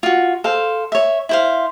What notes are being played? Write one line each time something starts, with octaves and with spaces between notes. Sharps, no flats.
F4 F#4
A4 C5 F5
C#5 E5
E4 C5 F5